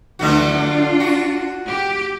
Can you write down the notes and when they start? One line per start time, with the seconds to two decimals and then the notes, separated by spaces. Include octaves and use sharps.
0.19 D2 D3 E3 A3 F#4
0.58 D4 F4
1.00 F#4
1.69 G4